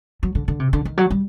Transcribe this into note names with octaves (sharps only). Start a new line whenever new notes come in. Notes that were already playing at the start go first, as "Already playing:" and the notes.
F#3
D3
D3
C3
D3
D#3
F#3
G3